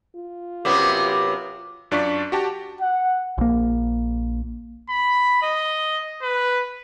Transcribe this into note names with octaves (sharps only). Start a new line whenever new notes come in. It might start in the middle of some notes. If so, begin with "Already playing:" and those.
F4
F#2 C3 B3 G4 D6
F#2 D4 F4 D5 C#6 B6
F#4 G4 A5
F#5
A#1 A#3
B5
D#5
B4